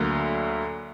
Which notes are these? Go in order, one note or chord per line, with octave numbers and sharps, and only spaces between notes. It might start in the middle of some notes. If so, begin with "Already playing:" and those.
Already playing: D2 D3 F#3 A#3